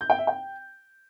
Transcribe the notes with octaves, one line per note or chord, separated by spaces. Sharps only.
G6
G5
E5
G5